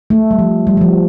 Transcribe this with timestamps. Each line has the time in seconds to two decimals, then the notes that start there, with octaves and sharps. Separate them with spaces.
0.10 A3
0.31 G3
0.39 F3
0.67 G3
0.77 G3
0.81 F3